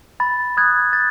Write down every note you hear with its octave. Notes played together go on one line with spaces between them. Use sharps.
B5 A6
D#6 F#6 G#6
B5 A6